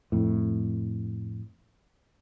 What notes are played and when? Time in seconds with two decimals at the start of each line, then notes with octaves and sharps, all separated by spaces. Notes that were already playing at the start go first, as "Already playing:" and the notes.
0.12 F2 A2